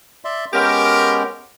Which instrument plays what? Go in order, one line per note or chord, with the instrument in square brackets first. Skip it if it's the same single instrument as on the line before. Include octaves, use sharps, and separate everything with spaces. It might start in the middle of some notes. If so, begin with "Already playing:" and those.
[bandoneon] D5 E5 C6
[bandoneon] G#3 B3 C#4 [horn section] G4 A#4